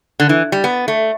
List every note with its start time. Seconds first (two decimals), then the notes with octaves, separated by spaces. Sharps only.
0.20 D3
0.29 E3
0.52 G3
0.64 B3
0.88 A3